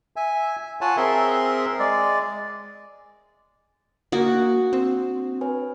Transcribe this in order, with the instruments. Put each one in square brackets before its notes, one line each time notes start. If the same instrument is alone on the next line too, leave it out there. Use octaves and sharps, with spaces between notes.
[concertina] E5 G#5
F4 C#5 F#5 G#5 A5
C4 G#4 A#4 E5 C6
G#3 D5
[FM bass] A#3 [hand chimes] D4 D#6 [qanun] F#4
[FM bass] C4
[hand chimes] B4 C#5 G#5